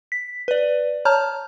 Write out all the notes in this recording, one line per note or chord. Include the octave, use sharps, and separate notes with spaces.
B6
B4 D5
C#5 A5 A#5 F6 G6